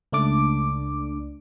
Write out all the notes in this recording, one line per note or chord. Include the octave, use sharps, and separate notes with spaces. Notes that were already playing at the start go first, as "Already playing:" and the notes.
C#2 A3 D4 D5 D6